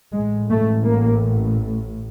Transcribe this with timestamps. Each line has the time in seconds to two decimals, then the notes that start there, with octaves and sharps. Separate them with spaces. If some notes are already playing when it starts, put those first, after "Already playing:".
0.13 A1 A2 G#3
0.49 A3
0.84 A#3